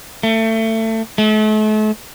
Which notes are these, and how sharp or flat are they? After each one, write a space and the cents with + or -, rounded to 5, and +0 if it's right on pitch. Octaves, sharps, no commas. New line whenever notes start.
A3 +25
A3 -40